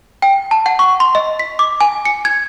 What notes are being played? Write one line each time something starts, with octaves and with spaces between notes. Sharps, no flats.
G5
A5
F#5
C#6
C6
D#5
B6
D6
G#5
C#7
G#6